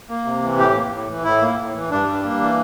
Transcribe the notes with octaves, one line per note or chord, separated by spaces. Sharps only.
A#3
C3
E3
A2 G4
A#3
A2
E3
A2 E4
A#3
A2
E3
G2 D4
G3
A#3
E3